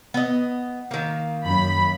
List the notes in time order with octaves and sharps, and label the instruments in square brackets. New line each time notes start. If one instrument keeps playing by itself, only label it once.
[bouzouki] B3 D#5
D#3 A#3
[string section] F#2 B5